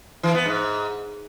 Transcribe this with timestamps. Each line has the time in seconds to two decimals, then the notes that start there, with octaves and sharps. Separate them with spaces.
0.23 E3
0.35 B3
0.46 G#2